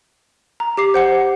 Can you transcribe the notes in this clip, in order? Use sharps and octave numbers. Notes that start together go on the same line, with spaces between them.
A#5
G4 D6 C7
C5 F#5 C#7